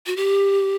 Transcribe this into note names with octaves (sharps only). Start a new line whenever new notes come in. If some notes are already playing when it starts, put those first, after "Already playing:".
F#4
G4